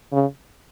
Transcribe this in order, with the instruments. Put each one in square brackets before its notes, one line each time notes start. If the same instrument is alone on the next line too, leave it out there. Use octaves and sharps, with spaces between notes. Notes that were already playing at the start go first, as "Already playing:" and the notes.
[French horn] C#3